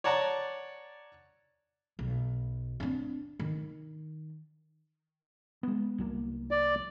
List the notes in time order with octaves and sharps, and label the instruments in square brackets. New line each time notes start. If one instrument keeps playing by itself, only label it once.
[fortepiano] C#5 D5 F#5 A5 A#5
[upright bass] B1
C4 D4
D#3
[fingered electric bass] G#3 B3
C2 F#3 A#3
[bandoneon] D5